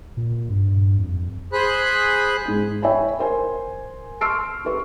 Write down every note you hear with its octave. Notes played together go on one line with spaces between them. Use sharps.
A#2
G2
F2
G#4 C5 B5 F#6
G#2 G#4
C#5 E5 G5 G#5 B5
A#4 C5 G#5
C6 C#6 E6 F6 C7 D7
G4 A4 B4 C#6